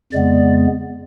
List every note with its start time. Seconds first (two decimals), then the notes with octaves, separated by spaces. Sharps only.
0.12 F2 C#3 G#3 B3 D5